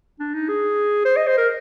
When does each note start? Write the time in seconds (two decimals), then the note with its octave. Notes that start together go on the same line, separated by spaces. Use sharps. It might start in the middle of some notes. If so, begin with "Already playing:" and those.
0.19 D4
0.34 D#4
0.48 G#4
1.05 C5
1.16 D#5
1.27 C5
1.37 A#4